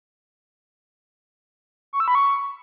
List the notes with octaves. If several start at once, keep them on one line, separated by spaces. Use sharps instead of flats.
C#6
E6
B5
C#6